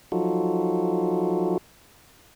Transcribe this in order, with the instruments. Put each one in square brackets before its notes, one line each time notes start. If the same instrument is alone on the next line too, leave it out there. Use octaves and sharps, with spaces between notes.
[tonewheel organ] F3 F#3 D#4 F4 F#4 A4